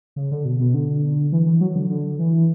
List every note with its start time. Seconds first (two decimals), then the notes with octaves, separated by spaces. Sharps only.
0.16 C#3
0.31 D3
0.45 B2
0.59 B2
0.74 D3
1.32 E3
1.46 E3
1.61 F#3
1.76 D3
1.90 D3
2.19 E3